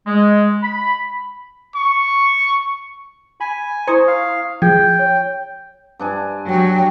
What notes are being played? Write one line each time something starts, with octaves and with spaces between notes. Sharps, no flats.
G#3
B5
C#6
G#5 B5
E4 C5 A#5 C#6 D#6 G#6
F5
F3 G#4 G5 G#6
C#5
G2 D4 G#5
F#3 G5